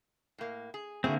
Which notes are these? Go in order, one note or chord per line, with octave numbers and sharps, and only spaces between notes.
A2 A#3
G#4
D3 A#3 C4 E4 F#4 G#4